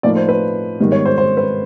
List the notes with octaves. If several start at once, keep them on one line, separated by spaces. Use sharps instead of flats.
A2 F3 A#3 D#4 D5
C5
B4
G#2 D#3 G3 B3
C#5
C5
C5
B4